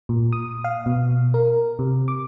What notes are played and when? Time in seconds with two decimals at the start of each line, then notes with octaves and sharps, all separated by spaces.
0.09 A#2
0.33 D#6
0.64 F5
0.86 B2
1.34 A#4
1.79 C3
2.08 D6